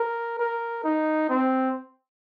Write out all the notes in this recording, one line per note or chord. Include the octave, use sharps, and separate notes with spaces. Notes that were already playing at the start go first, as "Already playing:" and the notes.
Already playing: A#4
A#4
D#4
C4